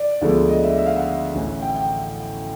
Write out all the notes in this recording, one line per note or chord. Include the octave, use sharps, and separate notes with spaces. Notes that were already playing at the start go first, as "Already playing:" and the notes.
Already playing: D5
D2 D3 F3 G#3 B3
D#5
E5
E5
F5
F#5
A1 A2 E3
G5
G5